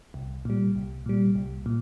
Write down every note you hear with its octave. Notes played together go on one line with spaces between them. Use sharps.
C2
A#2 G3
C2
A#2 G3
C2
A#2